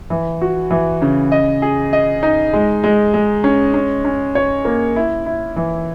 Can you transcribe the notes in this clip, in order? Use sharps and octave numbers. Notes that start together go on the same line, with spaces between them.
E3
F#4
E3
C#3
D#5
G#4
D#5
D#4
G#3
G#3
G#3
C#4
C#4
C#4
C#5
A#3
E4
E4
E3